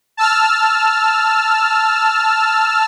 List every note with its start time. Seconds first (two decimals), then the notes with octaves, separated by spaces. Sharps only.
0.17 A5 E6 F6